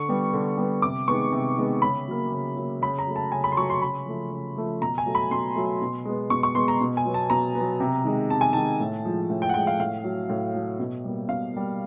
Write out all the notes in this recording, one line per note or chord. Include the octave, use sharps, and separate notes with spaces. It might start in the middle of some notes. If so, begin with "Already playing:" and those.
Already playing: D3 C#6
G3 B3
D3
G3 B3
C3 D6
D#3 G#3 B3 C#6
C3
D#3 G#3 B3
C#3 B5
F#3 A#3
C#3
F#3 A#3
C#3 B5
A#5
F#3 A3
A5
C#3 G#5
B5
C6
F#3 A3 C#6
C6
C#3 B5
F3 A3
C#3
F3 A3
B2 A#5
G#5
F#3 A3
B5
B2 C6
F#3 A3
B2
G#3 B3
B2 C#6
C#6
G#3 B3 C6
A#5
B2
G#5
F#3 B3
A5
B2 A#5
B3
F#3
C3
D#3 G#3
C3 A5
G#5
D#3 G#3 A5
A2
F3 G#3
A2
G5
F#5
F3 G#3 G5
F5
A2 F5
F#3 A3
A2
F#3 A3
B2
G3 A#3
B2 F5
G3 A#3